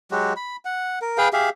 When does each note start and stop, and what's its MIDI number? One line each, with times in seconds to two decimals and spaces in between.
0.11 0.33 54
0.11 0.33 56
0.11 0.33 66
0.11 0.33 67
0.36 0.56 83
0.65 0.99 78
1.02 1.18 70
1.18 1.28 68
1.18 1.28 71
1.18 1.28 77
1.18 1.28 79
1.33 1.50 67
1.33 1.50 68
1.33 1.50 76
1.33 1.50 77